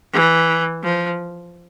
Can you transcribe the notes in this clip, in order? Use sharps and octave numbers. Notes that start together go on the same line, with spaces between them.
E3
F3